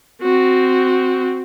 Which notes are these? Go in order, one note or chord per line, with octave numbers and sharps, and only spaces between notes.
C4 F#4